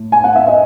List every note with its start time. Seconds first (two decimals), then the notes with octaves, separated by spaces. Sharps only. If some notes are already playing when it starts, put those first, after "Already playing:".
Already playing: A2
0.12 G#5
0.24 F#5
0.36 E5
0.47 D#5